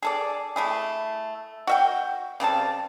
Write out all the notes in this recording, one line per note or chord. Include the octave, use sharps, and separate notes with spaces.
G#4 A4 D5
A3 E4 G#4
F#4 E5 G5
C#3 G3 C4 A5